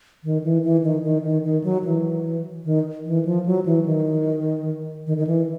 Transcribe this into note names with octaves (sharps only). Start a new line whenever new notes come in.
D#3
E3
E3
D#3
D#3
D#3
D#3
F#3
E3
D#3
E3
F3
F#3
E3
D#3
D#3
D#3
E3